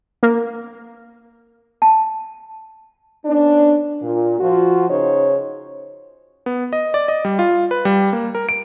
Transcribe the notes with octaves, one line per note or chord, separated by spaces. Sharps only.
A#3
A5
B3 C#4 D4
A#2
F3 F4 F#4
C#3 D#4 C5 C#5
B3
D#5
D5
D#5
G3
F4
B4
G3
A#3
A#4
D7